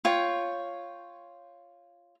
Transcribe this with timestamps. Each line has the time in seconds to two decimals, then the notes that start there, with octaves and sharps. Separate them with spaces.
0.05 F4 C#5 G5